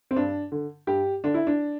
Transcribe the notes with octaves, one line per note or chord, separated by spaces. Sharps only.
C4
G2 D4
D3
G2 G4
D3 D4
E4
D4